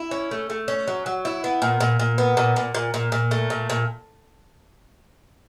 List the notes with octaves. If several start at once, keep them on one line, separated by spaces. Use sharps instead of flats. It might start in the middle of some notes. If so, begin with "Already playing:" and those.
Already playing: E4
C#4
A3
A3
C#4
F#3
F#3
E4
B3
A#2
A#2
A#2
B3
A#2
A#2
A#2
A#2
A#2
A3
A#2
A#2